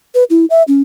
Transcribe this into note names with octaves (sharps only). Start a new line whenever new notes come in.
B4
E4
E5
C#4